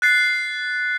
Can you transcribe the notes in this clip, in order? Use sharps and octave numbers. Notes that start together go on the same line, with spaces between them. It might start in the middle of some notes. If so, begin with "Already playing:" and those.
F#6 A6 C7